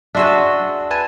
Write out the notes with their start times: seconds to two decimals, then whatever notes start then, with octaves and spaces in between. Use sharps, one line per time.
0.15 D4 F#4 G#4 E5 C6 E6
0.91 B4 G#5 A5